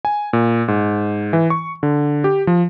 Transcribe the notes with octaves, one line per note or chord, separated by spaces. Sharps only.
G#5
A#2
G#2
E3
C#6
D3
G4
F3